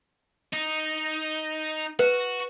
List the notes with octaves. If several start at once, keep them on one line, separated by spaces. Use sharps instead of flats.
D#4
F#4 B4